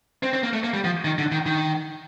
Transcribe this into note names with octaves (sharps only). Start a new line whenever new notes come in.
C4
C4
A#3
A3
A#3
G3
F3
D#3
D3
D#3
D#3